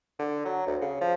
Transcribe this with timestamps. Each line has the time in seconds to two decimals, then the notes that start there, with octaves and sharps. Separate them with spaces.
0.19 D3
0.45 F#3
0.67 D2
0.82 C#3
1.01 F3